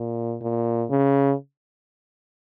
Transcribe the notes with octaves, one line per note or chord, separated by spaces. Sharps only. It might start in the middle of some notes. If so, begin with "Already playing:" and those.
Already playing: A#2
A#2
C#3